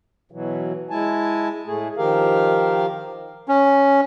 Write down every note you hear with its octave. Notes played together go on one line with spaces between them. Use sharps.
B2 E3 F#3
G#3 E4 G#5 A5
A2 A3 G#4
D#3 F3 G4 A#4 F5
C#4